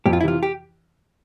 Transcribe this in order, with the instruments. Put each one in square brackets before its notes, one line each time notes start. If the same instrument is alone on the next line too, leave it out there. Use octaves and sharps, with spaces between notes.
[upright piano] F2 [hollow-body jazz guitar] G4
[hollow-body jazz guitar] F4
E4
[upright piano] C3 E3 [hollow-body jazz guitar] F4
[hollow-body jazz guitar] G4